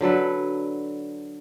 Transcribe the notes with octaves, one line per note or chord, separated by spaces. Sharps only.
D3 F#3 A4 B4